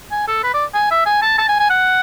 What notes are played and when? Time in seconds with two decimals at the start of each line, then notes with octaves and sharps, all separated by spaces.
0.11 G#5
0.28 A4
0.43 B4
0.54 D5
0.74 G#5
0.91 E5
1.06 G#5
1.22 A5
1.38 A5
1.48 G#5
1.60 G#5
1.70 F#5